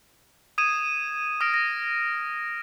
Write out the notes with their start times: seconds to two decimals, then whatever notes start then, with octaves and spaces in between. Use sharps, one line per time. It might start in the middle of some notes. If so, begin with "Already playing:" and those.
0.58 D#6 G#6 D#7 E7
1.41 D#6 F6 A#6 D7
1.54 A#6